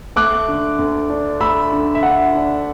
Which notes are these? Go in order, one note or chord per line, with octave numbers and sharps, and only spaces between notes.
A3 D6 F#6
D3
D2
D4
A3 B5 E6
D3
E5
D3 F#5
D4